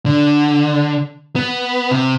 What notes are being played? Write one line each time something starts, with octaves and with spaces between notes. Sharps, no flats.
D3
B3
C3